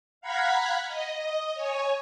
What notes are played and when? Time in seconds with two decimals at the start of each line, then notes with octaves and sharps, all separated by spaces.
0.21 F5 F#5 A#5 B5 G#6 B6
0.88 D#5
1.54 C#5 G#5